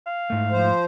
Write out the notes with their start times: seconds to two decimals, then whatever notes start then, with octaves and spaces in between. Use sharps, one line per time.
0.07 F5
0.30 G#2 A3
0.52 F3 C5